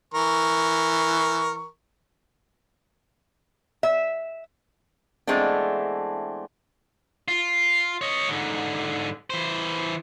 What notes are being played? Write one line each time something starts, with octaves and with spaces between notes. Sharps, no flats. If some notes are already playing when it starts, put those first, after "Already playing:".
E3 A#4 C#6
E5
E3 G#3 A3 B3 C4 D4
F4
C#5 D#5
G#2 D3
E3 C5